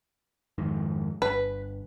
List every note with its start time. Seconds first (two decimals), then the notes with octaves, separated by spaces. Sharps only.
0.58 F2 G#2 D#3
1.22 G1 B4